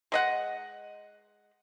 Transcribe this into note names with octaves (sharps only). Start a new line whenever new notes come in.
G#3 D#5 F#5